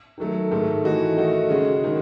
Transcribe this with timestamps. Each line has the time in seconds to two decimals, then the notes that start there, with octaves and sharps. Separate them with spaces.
0.18 D#3 F#3 A3
0.51 G#2 D#3 A3
0.84 E3 A3 D#4 F#4
1.17 D#3 A3 D#4 F#4
1.49 C#3 G#3 C#4 F#4
1.84 D#3 G#3